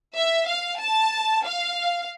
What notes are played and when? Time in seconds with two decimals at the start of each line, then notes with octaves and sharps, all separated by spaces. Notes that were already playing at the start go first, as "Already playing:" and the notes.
0.15 E5
0.48 F5
0.80 A5
1.45 F5